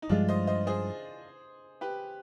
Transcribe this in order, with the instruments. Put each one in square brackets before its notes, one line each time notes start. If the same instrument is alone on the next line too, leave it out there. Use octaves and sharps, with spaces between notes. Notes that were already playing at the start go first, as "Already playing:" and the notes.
[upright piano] D#4
[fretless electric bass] G2 F3 G#3 [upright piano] D4 F4
[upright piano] C5 D#5
C5 D#5
G#4 C5
G4 B4